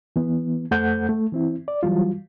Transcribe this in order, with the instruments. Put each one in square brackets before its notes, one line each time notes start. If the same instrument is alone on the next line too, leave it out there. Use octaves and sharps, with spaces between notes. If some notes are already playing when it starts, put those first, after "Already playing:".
[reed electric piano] E3 B3
F2 A3 A4 C5 F#5 G6
A3
E3 C4 E4
D5
E3 F#3 G3 F4